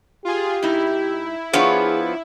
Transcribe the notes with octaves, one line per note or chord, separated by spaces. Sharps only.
F4 G4 G#4
G#2 D#4 E4
F3 B3 D4 F4 G#4 C#5